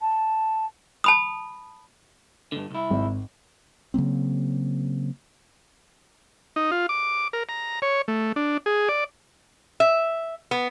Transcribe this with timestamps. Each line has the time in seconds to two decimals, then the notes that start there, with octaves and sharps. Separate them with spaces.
0.01 A5
1.04 A5 B5 D#6
2.52 G2 D3
2.71 C2 E4
2.90 G#1
3.94 C#3 F#3 A#3 C4
6.56 D#4
6.71 F4
6.89 D6
7.33 A#4
7.49 A#5
7.82 C#5
8.08 A3
8.36 D4
8.66 G#4
8.89 D5
9.80 E5
10.51 B3